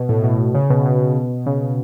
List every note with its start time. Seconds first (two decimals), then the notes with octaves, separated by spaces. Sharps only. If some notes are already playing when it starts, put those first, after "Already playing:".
Already playing: B2
0.09 A2
0.24 B2
0.54 C#3
0.70 B2
0.86 B2
1.46 C#3